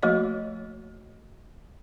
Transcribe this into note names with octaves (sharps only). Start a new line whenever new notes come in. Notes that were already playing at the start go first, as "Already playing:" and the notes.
F3 A3 A#3 F#4 C#5 D#5